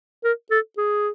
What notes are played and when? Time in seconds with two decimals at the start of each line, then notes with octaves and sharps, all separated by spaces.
0.24 A#4
0.51 A4
0.78 G#4